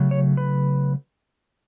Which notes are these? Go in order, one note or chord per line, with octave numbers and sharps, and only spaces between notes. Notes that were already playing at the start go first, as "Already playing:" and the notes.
Already playing: C#3 F#3 A3
C#5
B4